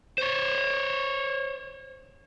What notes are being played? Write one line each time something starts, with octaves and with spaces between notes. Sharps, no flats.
C5 C#5